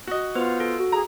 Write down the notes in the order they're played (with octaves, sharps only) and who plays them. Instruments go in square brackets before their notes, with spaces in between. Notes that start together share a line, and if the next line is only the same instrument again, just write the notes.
[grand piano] F#4 D#5
[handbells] B3 B4 C5 [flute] F4
[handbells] A4
[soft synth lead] F#4
[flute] G#4 [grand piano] A#5